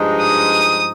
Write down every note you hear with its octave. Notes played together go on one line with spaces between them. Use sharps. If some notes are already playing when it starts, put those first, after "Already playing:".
Already playing: G2 F3 G#3 D#4
D#6